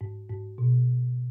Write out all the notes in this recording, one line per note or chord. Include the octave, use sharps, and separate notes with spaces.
G#2
G#2
B2